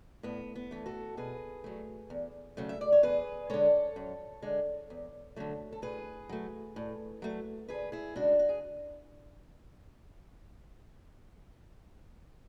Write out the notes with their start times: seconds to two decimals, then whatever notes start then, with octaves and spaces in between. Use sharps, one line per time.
0.23 A2 B3
0.56 B3
0.71 E3 A3
0.86 F#4 A4
1.17 B2 G#4 B4
1.64 F#3 A3
2.10 E2
2.57 C#3 F#3 A3
2.69 E5
2.81 D5
2.92 C#5
3.03 E2 G#4 B4
3.50 D3 G#3 A4 C#5
3.96 F#2
4.42 D3 G#3
4.90 E2
5.36 D3 F#3 A3
5.73 A4
5.82 A2 G#4 B4
6.29 F#3 A3
6.76 A2
7.22 F#3 A3
7.68 D2 G#4 B4
7.92 E4 G#4
8.16 C#3 G#3 D4 F#4
8.39 F#4
8.49 G#4